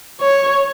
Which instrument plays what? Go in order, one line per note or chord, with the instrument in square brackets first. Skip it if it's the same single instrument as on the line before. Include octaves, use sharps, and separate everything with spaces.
[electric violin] C#5